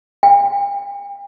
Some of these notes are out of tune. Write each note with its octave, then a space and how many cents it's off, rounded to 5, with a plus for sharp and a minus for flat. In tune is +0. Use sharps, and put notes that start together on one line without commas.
G5 +45